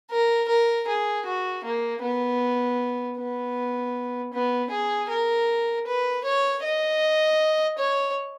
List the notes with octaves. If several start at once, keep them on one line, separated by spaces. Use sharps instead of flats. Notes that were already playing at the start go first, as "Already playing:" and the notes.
A#4
A#4
G#4
F#4
A#3
B3
B3
B3
G#4
A#4
B4
C#5
D#5
C#5